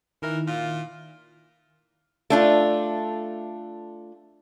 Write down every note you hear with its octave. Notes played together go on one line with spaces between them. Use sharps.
D#3 E3 E4 A#4
A#2 F4
A3 D4 F4